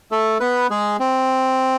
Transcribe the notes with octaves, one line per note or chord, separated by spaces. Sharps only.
A3 A4
B3 B4
G#3 G#4
C4